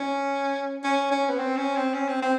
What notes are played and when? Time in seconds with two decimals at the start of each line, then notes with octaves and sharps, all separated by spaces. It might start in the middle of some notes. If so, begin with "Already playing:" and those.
Already playing: C#4
0.84 C#4
1.11 C#4
1.29 B3
1.39 C4
1.57 C#4
1.76 C4
1.94 C#4
2.09 C4
2.23 C4